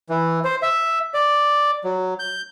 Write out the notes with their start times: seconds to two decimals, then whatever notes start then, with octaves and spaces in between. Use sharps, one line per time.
0.09 E3
0.44 C5
0.62 E5
1.14 D5
1.84 F#3
2.19 G6